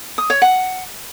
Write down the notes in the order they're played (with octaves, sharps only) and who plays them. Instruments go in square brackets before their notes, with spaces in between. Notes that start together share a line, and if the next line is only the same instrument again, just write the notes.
[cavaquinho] D#6
C#5
F#5